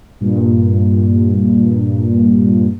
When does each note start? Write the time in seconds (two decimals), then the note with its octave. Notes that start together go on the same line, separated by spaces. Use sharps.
0.21 G2 A#2